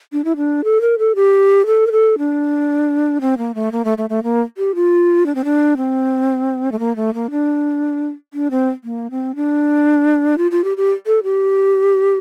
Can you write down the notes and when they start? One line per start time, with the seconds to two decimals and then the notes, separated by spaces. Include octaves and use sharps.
0.13 D4
0.25 E4
0.36 D4
0.64 A4
0.81 A#4
0.98 A4
1.15 G4
1.66 A4
1.87 A#4
1.92 A4
2.18 D4
3.21 C4
3.38 A#3
3.55 A3
3.72 A#3
3.85 A3
3.98 A3
4.10 A3
4.23 A#3
4.58 G4
4.75 F4
5.26 D4
5.35 C4
5.44 D4
5.77 C4
6.72 A3
6.79 A#3
6.96 A3
7.14 A#3
7.31 D4
8.34 D4
8.51 C4
8.84 A#3
9.11 C4
9.36 D4
10.38 F4
10.51 F4
10.64 G4
10.77 G4
11.07 A4
11.23 G4